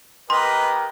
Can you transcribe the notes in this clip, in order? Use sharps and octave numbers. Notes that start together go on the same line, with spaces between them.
B3 G4 A#4 B4 D#5 C6